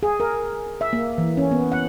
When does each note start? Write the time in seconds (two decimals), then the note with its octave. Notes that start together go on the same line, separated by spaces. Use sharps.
0.03 G#4
0.20 A#4
0.81 E5
0.93 A#3
1.18 E3
1.37 C#4
1.51 B3
1.72 F#5